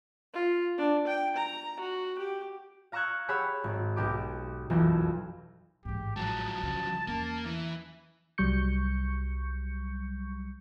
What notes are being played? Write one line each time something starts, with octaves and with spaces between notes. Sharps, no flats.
F4
D4
G5
A#5
F#4
G4
F5 A#5 C#6 E6 F#6 G#6
G4 G#4 C#5 F#5 B5 E6
G#1
B1 G4 D6
F#1 B1 F2 E3
A1 G#2 G4
F3 F#3 A5
C#3
E2 A#3 C#4
E3
C2 F#3 G3 C#6 G6 C#7